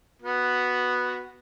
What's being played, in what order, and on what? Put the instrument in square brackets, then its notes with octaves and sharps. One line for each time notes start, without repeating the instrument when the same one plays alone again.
[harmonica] B3 F#4